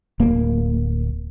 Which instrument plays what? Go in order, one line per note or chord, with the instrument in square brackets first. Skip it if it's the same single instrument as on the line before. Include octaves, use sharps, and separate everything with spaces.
[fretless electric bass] D1 A#3